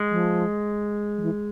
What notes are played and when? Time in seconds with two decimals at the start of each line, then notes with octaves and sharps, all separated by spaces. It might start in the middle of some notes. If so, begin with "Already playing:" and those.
Already playing: G#3
0.11 F3
1.18 F3
1.22 E3